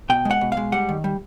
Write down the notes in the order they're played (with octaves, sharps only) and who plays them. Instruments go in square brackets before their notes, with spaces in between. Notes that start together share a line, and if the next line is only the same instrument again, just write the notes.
[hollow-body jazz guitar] B2 G5
G#3
F#5
B2
F5
G#3
G3 F#5
D#3
G3